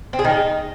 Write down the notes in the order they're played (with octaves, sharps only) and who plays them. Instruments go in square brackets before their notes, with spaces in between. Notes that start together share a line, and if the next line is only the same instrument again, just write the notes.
[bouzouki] C4
G#4
D#3
D#4